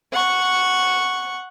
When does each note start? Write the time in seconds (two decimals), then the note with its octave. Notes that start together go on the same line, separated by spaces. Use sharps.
0.13 F#5 C#6